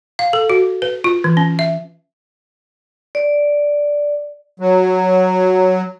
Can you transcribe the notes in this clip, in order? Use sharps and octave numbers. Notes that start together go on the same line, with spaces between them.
F5
A4
F#4
B4
F4
E3
C#4
E5
D5
F#3